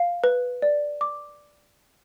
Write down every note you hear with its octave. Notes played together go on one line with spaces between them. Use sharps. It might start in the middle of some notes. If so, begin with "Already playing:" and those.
Already playing: F5
B4
D5
D6